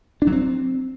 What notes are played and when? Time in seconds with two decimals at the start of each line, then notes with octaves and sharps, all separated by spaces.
0.22 D4
0.27 F#3
0.32 C4